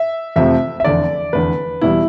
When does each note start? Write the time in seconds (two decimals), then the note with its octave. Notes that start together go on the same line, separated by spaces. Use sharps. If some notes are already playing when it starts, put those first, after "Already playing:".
Already playing: E5
0.36 F2 C3 F3 A3 E5
0.80 E5
0.84 F1 E2 D3 D5
1.33 F1 E2 D3 B4
1.81 E2 B2 G3 E4